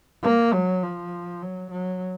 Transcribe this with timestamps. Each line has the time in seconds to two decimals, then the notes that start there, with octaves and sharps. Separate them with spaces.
0.23 A#3
0.53 F#3
0.82 F3
1.42 F#3
1.71 F#3